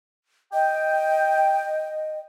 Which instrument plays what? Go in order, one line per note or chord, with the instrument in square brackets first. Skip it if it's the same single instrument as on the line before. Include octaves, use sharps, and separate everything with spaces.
[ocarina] D#5 [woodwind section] G5